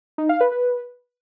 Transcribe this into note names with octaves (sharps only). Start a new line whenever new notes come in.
D#4
F5
B4
B4